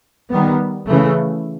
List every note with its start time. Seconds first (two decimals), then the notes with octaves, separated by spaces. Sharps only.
0.30 D#3 G3 B3
0.87 C#3 E3 A3